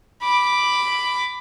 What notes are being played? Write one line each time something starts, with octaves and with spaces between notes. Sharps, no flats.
B5 D6